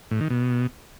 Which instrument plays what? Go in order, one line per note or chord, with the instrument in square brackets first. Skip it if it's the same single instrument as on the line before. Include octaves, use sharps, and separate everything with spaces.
[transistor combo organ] A2
D#3
B2